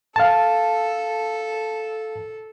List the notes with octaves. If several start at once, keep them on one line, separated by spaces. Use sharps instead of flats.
A4 F5 A5